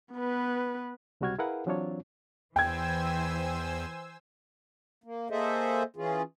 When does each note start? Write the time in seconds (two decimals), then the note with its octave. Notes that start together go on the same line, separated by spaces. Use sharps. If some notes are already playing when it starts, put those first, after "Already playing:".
0.14 B3 B4
1.21 C#2 C3 G3 F#4 F6 G#6
1.39 E4 G#4 A#4 B4 F5 F#5
1.66 E3 F#3 C4 D4 F4 C#5
2.56 E2 E3 C5 G5 G#5 E6 G#6
5.04 A#3
5.30 A#3 G#4 A4 C5 D#5 E5
5.96 E3 C#4 F4 G#4